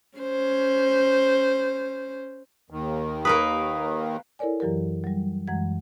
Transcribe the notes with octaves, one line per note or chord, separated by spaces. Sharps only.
C#4 C5
D#2 D#3
A#3 A#4 B4 D#6
E4 A4 A#4 C#5 D5 G#5
F#2 E3 F#3 G4 A#4
F#3 G3
F#2 E3 G#3 F#5 G#6